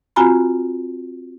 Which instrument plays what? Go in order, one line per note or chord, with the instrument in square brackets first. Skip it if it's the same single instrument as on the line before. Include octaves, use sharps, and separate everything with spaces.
[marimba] C4 F4 F#4 G#5 A#5 B5